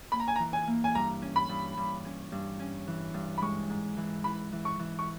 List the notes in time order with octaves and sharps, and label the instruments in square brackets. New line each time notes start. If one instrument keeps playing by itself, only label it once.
[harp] A#3 [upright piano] B5
[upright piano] A#5
G#5
A#5
[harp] E3
[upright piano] G#5
[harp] A#3
[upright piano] G#5
[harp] G2 [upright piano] A#5
[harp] C#4
[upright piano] B5
[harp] G2
G2
C#4
G2
C#4
E3
G2
[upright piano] B5
[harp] G#3 [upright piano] C#6
[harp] G#2
E3
[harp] E3 [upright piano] B5
[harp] E3
[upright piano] C#6
[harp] E3
[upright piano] C#6